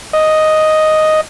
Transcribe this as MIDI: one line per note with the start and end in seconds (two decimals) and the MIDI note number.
0.13 1.21 75